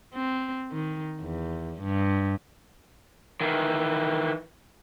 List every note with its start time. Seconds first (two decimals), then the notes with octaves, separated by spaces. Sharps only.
0.14 C4
0.72 D#3
1.21 E2
1.82 G2
3.41 D#3 E3